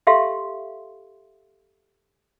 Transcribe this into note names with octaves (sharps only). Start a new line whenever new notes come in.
G4 A4 E5 F5 C6